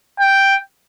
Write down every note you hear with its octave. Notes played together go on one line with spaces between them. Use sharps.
G5